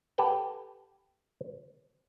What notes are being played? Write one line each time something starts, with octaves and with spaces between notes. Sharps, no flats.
G4 A4 B4 F#5 G5